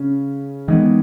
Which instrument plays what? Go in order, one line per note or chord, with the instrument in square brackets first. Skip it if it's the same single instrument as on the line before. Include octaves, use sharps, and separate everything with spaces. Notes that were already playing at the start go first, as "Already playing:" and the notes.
Already playing: [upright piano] C#3 C#4
[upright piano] D#3 D#4 [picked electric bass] E3 G#3 B3